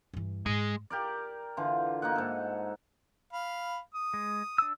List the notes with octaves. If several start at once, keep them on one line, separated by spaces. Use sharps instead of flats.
G2 E3
G#2 G#3
G4 A#4 D5
D3 E3 F4
A#3 D#4 D#5 F#5
G#2 A4
F5 B5
D#6
G#3
D4 E6